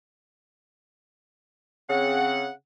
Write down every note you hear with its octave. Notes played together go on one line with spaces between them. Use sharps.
C#3 C4 F#5